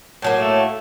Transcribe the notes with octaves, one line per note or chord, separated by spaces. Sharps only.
A2 F#3 A#3
A3